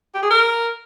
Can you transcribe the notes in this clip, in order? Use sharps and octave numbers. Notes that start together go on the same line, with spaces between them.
G4
G#4
A#4